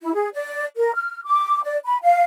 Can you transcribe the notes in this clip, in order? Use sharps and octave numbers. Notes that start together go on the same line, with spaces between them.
E4
G#4
D5
A#4
F6
D6
D5
B5
F5